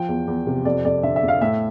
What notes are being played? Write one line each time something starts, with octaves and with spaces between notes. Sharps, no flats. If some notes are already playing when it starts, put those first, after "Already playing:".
Already playing: F3 G5
E2
E2
C3
F2 D5
F2 D5
D3 E5
E5
F2
F5
A2 E5